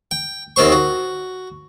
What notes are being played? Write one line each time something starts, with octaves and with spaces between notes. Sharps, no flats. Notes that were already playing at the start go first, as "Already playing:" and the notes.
G5
D#2 D#3 C4 C5 C#6
F#4